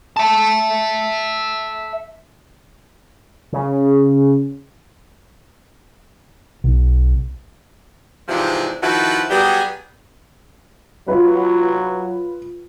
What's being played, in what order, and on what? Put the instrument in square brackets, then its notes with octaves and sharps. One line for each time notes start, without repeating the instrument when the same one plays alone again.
[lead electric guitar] E5 A5
[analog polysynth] C#3
[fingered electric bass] B1
[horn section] G#2 C3 E3 F3 G#3 D4
D#3 F3 E4 F#4 A4 B4
F#3 G3 B3 G4 G#4
[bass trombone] F#3 [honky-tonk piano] F4 B4